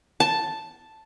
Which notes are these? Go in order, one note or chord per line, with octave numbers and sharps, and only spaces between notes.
A5